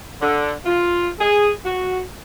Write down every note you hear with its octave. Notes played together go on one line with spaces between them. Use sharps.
D3
F4
G#4
F#4